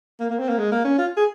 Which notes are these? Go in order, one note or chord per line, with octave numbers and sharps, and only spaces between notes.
A#3
A#3
C4
A#3
G#3
A#3
C#4
F4
G#4